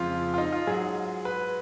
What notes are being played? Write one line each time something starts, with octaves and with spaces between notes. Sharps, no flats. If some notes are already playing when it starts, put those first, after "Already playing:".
Already playing: F2 C#3 F3 G#3 F4
F4
D#4
F4
G#2 F#3 G#4
B4